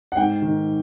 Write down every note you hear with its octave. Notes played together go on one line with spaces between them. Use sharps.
F#5
G#2 G5
D#3